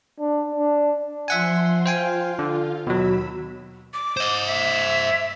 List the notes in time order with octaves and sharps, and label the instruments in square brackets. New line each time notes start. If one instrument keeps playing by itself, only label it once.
[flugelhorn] D4
D4
[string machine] F3 C6 [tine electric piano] E5 F#5 G#5
[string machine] F4 F5 [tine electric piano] C5 G5 G#5
[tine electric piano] D3
[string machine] D#2 B5 E6 [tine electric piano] B2 F#3
[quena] D6
[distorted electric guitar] C5 D#5
[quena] E5